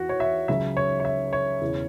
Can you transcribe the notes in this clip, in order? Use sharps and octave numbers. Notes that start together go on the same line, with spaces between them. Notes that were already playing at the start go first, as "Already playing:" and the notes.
Already playing: E2 E3 F#4
C#5
E5
C#2 C#3 F#3 E5
C#5
C#5
E5
C#5
E1 E2 C#3 E3